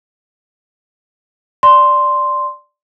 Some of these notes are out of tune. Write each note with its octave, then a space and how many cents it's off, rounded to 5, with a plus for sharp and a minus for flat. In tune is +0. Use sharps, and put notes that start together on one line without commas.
D5 +0 C6 +0